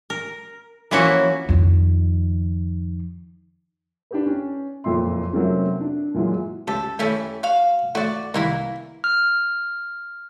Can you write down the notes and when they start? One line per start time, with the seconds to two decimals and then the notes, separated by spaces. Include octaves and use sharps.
0.10 A#4
0.91 E3 F3 A#3 C#4 E4 F#4
1.49 F2 D#3
4.11 D4 G4 B4
4.26 C#4
4.84 F#1 F2 A#2 E5 C6
5.33 C3 F#3 A3 A#3 C4 C#4
5.81 D4
6.14 A#2 E3 F#3 G#3
6.68 C#2 G4 A4
6.99 E3 G3 A3 C#4 A4
7.43 F#4 F5
7.95 A3 F#4 D5
8.34 C2 D#3 E3 A#3 E4
9.04 F6